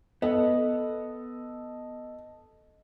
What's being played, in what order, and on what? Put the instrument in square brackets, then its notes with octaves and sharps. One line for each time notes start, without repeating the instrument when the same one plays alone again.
[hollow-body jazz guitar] B3 [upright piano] A4 D#5